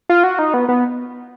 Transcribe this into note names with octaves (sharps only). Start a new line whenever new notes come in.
F4
F#4
D#4
B3
B3